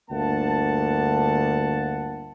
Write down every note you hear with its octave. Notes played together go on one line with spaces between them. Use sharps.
G1 D2 A#3 F#5 A5